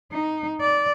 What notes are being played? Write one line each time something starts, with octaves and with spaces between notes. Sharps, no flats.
D#4
D5